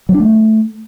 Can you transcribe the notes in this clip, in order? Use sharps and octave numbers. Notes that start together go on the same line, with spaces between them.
F#3
D4
A3